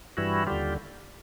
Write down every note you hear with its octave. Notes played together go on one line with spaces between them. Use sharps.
G2 E3 G3 E4 F#4
D#2 D3 G3 F4 G4